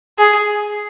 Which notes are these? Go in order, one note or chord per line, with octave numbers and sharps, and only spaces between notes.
G#4